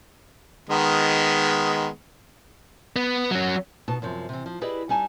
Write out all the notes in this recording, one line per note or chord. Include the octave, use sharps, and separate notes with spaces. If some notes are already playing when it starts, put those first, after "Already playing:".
D#3 G#3 B3
B3
F#3 C#4
B2 D#4 A5
F#2 C3 F3
C3 E3
F3
E4 G4 G#4 B4 D5 D#5
G3 D#4 G#5 A5